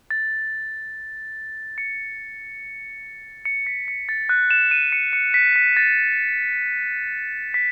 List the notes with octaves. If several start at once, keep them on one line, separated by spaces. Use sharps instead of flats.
A6
C#7
C#7
B6
C#7
A6
F#6
E7
D#7
C#7
C#7
B6
B6
A6
B6